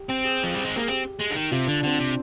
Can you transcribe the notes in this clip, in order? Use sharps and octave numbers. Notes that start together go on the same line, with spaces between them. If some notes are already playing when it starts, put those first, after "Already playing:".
Already playing: G4
C4
G#4
F3
G3
G#3
A#3 G#4
C4 G4
G#3
D3
D#3
C3 F4
D3 D4
D4
D3 C4
C3